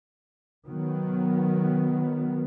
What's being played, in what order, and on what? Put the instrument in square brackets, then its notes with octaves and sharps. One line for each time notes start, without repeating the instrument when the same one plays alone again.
[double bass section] D#3 F#3 B3